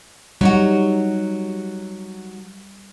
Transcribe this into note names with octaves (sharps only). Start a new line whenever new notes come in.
F#3 G3 D#4 F#4